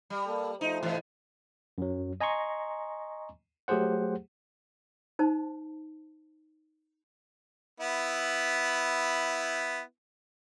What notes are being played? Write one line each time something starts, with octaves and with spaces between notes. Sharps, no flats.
G3
A#3 A4
F3 A3 D#4 C5
G#2 C3 E3
F#2 F#3
D#5 G#5 A#5 C6 C#6
F#3 A3 G4 G#4 C5 F#5
D#4 C5 A5
B3 E4